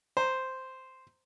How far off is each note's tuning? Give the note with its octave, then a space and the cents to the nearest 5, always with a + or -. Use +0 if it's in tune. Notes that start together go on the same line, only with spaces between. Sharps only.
C5 -5 A#5 +0